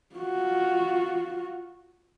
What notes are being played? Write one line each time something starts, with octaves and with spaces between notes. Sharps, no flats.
F4 F#4